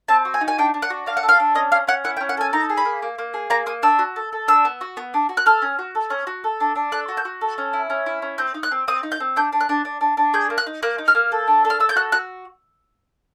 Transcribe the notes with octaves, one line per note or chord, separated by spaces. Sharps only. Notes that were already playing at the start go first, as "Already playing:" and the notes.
C4 A5
F#4
G#5
D#4
G#5
D4 G5
D4
F#5
F#4
D4 F5
F#5
A4
F5
D4
C#4 D#5
C#4 F5
C#4 F#5
E4 F#5
G5
C#4
F#5
A4 G#5
D#4 A#5
G#4
B5
A#3
A#3
A#3
G#4
A#3 A#5
A#3 D#6
D4 E6
F#4
A4
A4
D4 E6
B3
F#4
B3
D4
F#4
F#6
A4 F6
C#4
F#4
A4
C#4
F#4
A4
D4
D4
A4 F#6
F#4
G6
F#4
A4
C#4
E4
C#4
E4
C#4
C4 G6
D#4
F#6
C4
C4 D#6
D#4
G6
C4
D4 G6
D4
F#6
D4
D4
D4
D4
G#4 G6
A#3
F#6
D#4
A#3 F#6
D#4
F6
A#3
A4
D4
A4
F6
A4 E6
G6
F#4 F#6
F#4 F#6